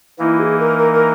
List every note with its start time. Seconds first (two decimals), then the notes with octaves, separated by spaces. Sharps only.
0.19 E3 A#3 D#4 E4
0.39 G#4
0.59 A#4
0.78 A#4
0.93 A#4